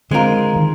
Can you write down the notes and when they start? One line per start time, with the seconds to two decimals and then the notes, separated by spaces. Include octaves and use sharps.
0.11 D3 G#3 C4 F4 A#4
0.56 D#3